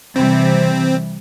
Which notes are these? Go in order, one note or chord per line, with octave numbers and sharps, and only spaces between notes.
C3 E3 G3 C4